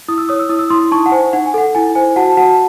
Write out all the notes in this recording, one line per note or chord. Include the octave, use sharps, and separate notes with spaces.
E4 D#6
E6
C#5 D#6
E6
E4 D#6
E6
E4 C6 D#6
D#4 A5 C#6
F#5
C5 G#5
D#4 F#5
G#5
A4 F#5
E4 G#5
C5 G#5
F#4 F#5 A5
F#4 F#5 A5